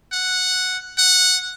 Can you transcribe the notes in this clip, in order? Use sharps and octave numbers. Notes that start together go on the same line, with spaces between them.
F#5
F#5